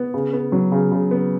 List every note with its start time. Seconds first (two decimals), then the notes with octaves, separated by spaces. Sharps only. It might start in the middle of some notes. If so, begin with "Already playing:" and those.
Already playing: B3
0.14 C#3
0.33 B3
0.52 F#3
0.72 C#3
0.92 C#3
1.11 B3